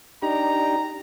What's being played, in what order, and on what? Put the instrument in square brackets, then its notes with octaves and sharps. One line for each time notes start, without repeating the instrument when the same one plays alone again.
[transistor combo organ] D4 D#4 G4 [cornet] A#5